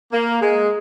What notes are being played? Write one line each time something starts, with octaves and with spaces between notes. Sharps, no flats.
A#3
G#3